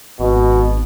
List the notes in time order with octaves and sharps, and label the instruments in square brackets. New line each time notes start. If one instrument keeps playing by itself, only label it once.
[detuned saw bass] G#1 [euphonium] B2